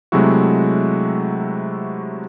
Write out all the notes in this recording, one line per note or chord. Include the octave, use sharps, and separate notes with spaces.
C3 F#3 G#3 A3 E4 F#4